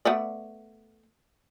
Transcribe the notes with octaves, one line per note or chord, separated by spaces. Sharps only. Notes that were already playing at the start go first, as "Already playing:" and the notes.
A3 B3 D5